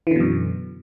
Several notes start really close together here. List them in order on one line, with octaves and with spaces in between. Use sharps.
E3 D3 B2 F#2